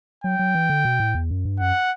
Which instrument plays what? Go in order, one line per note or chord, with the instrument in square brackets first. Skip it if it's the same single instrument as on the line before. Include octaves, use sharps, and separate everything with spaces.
[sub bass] F#3 [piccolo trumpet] G5
[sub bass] F#3
E3
D3
B2
A2
E2
F#2
G2
[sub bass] F#2 [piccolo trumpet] F#5